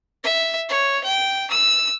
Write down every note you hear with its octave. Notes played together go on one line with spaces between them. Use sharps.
E5
C#5
G5
E6